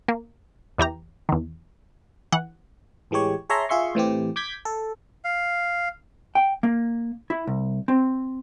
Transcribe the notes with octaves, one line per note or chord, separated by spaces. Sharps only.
A#3
E2 E3 G4 A#5
E2 D#3
E3 F#5
A1 E3 G#3 G4 C#5
G#4 C#5 E5 A5 A#5 C6
F4 G#4 E5 C6 C#6
A2 E3 C4 G4
D6 G6 G#6 B6
A4
F5
G5
A#3
E4
C2
C4